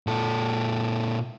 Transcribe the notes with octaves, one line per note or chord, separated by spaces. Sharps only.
A#2 A4